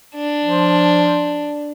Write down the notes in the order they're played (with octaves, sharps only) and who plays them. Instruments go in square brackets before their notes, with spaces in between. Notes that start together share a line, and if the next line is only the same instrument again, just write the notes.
[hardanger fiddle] D4
[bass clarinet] F3